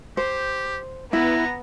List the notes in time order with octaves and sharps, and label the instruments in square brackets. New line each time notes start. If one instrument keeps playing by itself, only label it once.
[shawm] G4 [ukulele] C5
[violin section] B3 [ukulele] E4 [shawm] A#5